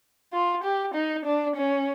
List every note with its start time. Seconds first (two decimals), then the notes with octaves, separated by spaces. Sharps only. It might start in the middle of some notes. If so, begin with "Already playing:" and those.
0.33 F4
0.64 G4
0.95 D#4
1.25 D4
1.56 C#4